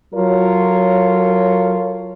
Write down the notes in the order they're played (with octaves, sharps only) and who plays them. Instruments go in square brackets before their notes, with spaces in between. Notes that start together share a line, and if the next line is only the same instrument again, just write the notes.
[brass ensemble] F#3 F4 A4 A#4 C#5